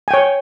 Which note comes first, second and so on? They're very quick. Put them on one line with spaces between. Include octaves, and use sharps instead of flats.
G#5 G5 C#5